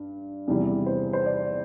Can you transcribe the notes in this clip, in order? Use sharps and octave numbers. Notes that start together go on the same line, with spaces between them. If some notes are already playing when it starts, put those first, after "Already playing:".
Already playing: G2
E2 C3 E3 G3
C5
C5
D5